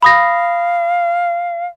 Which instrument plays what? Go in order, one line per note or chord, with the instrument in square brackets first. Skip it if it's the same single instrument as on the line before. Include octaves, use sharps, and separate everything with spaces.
[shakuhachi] F5 [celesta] B5 D#6 A#6